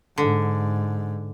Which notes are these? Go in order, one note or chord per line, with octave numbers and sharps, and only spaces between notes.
G#2 D3